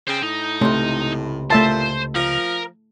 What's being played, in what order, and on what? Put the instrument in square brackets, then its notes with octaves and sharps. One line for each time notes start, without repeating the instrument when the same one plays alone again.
[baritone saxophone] C#3 [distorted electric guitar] C5 G5
[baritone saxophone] A2 [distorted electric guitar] D#4
[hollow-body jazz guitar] C#2 C3 [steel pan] A3
[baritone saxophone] A#2 [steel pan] A3 E5 A5 [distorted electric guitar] C5
[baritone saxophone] F3 [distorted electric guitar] A#4